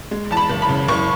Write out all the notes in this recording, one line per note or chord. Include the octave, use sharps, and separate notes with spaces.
G#3
E2 A5
B5
F#1
B5
C#3
F#1 C#6